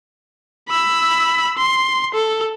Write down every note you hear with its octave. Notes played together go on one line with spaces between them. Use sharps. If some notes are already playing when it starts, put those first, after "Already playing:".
B5 E6
C6
A4